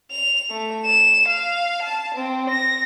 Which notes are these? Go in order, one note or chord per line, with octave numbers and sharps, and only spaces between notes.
F7
A3
E7
F5
A5
C4
A#6